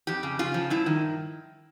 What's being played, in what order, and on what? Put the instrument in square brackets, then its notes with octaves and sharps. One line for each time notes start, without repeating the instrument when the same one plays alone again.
[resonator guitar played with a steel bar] F2 G4
C#3
C#3 F4
F3
G2 E4
D#3